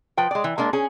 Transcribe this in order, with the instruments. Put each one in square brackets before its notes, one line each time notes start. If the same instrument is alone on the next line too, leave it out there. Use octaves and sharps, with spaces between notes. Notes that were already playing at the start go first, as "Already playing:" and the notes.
[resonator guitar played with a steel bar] F3 B4 G5
G#3 D5
E3
G#3 A#3 D4
C#4 G#4